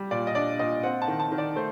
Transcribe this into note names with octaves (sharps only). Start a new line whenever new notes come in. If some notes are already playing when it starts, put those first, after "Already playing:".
Already playing: G3
A#2 D5
D#5
D4 D5
A#2 D#5
C4 F#5
A5
D#3
A5
D#3
D5
A3 C5